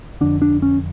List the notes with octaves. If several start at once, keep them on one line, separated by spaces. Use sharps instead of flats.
F2 D3 D4
D4
C#4